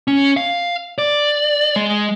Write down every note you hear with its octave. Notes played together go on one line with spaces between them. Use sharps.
C#4
F5
D5
G#3